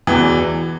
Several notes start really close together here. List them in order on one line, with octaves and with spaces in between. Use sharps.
E3 E2 B2